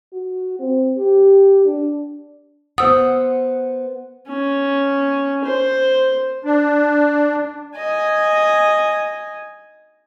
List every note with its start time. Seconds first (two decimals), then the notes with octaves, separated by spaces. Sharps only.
0.13 F#4
0.59 C4
0.97 G4
1.65 D4
2.78 B3 C5 F#5 D#6 E6
4.28 C#4
5.44 C5
6.45 D4
7.76 D#5 G#5